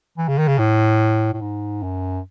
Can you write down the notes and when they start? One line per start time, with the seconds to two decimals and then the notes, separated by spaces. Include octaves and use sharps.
0.18 E3
0.28 C#3
0.38 D#3
0.48 C#3
0.59 A2
1.33 A2
1.41 G#2
1.83 F#2